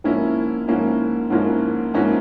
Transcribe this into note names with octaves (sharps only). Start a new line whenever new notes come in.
G#2 F3 A#3 C#4 E4
G#2 F3 A#3 C#4 E4
G#2 F3 A#3 C#4 E4
G#2 F3 A#3 C#4 E4